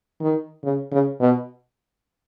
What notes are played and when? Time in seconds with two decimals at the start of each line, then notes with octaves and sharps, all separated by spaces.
0.21 D#3
0.64 C#3
0.92 C#3
1.20 B2